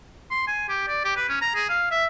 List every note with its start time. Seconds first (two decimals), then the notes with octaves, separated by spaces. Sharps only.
0.31 C6
0.48 G#5
0.69 G4
0.88 D5
1.05 G4
1.17 B4
1.29 C#4
1.42 A#5
1.56 G#4
1.69 F5
1.91 E5